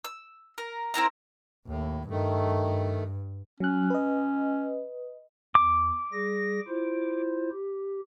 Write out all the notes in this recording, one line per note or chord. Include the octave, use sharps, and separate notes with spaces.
E6
A#4
C4 E4 A#4 A#5
D#2 A2
G2 D#3 A3
F#3 C#4 F#6
B4 D#5
E2 D6
G3 G#4 A#6
E4 F4 C5
G4